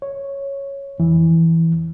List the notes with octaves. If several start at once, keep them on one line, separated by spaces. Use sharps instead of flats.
C#5
F2 E3